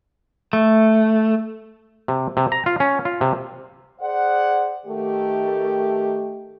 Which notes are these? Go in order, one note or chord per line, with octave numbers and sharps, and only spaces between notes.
A3
C3
C3
A#5
F4
C#4
F4
C3
G#4 C5 D5 F#5
D#3 A3 G4